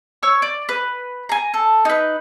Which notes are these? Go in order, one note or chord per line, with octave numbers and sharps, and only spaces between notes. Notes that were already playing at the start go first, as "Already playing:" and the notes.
C#5 C#6 E6
D5
B4
G#5 A#5
A4
D#4 B4